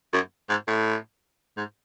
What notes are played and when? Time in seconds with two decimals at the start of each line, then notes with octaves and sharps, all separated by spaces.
0.13 F#2
0.49 G#2
0.68 A2
1.57 G#2